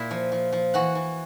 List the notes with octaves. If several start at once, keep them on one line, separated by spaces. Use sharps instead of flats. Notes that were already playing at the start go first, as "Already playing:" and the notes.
Already playing: A#2 E4 E5
F3
F3
F3
E3 F#4 F#5
E3